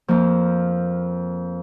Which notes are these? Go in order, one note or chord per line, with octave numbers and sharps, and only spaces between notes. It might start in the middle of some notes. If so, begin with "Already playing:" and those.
F2 F3 A#3